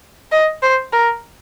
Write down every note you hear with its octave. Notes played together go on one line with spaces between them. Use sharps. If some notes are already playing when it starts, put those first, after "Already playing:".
D#5
C5
A#4